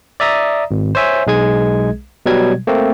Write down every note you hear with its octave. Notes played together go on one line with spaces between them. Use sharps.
D5 E5 A#5 D#6
G#1
C5 C#5 E5 G#5
B1 G#3 G#4 G#6
B2 F#3 G3 G#6
A3 A#3 C4